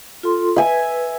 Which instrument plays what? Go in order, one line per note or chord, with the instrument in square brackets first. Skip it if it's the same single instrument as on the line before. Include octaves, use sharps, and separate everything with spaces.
[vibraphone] F4 A4 C6
[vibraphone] B4 [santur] E5 G#5